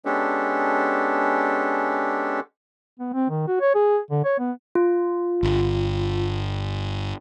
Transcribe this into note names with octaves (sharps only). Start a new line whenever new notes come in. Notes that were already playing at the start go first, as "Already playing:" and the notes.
G#3 B3 C#4 D4 G4 A4
B3
C4
D#3
F#4
C#5
G#4
D3
C#5
B3
F4
G1